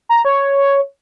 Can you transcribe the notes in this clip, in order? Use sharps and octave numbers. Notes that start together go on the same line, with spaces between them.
A#5
C#5